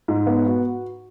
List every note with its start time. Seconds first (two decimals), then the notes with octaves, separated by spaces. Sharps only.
0.08 G#2
0.27 B3
0.46 F#4